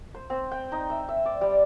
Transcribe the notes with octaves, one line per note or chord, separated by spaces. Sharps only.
C5
C4
G5
D#4
E5
E5
D5
G3